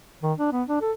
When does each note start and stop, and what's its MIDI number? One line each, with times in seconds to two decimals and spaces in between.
0.23 0.33 51
0.38 0.53 62
0.53 0.63 59
0.68 0.80 62
0.82 0.92 69